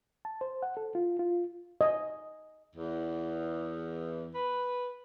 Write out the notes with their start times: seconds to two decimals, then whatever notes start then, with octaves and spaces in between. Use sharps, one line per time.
0.25 A5
0.41 C5
0.63 F#5
0.77 A4
0.95 F4
1.19 F4
1.81 D#5
2.75 E2
4.35 B4